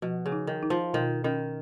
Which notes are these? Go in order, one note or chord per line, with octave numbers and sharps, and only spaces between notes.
B2 F3
C#3
D#4
D#3
D#4
F3
B2 D#3
D#3 C#4